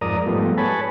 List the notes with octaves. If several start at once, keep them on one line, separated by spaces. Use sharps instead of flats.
F2 G#2 A#4 D5 A#5 D#6
G#2 F3 G3 A3 B3
B4 C#5 G#5 A5 B5